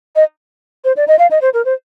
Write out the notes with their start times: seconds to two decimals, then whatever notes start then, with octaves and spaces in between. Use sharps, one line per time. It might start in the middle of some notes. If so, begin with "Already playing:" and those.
0.16 D#5
0.85 C5
0.97 D5
1.08 D#5
1.19 F5
1.31 D#5
1.41 C5
1.54 A#4
1.65 C5